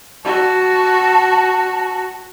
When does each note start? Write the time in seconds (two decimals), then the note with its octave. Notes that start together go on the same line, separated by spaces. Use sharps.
0.25 F#4 A5